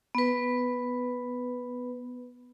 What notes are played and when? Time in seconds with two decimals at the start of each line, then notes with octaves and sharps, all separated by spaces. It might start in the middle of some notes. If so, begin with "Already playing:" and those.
0.15 B3 B4